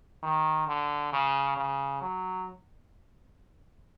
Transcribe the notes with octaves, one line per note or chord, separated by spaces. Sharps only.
D#3
D3
C#3
C#3
F#3